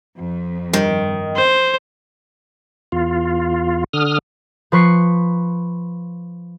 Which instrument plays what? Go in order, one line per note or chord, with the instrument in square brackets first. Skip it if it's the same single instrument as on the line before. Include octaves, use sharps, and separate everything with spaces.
[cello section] F2
[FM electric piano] G2 [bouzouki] D#3
[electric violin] C5
[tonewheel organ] E2 F4
D3 D#6 F6
[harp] F3 B4 C#6 C7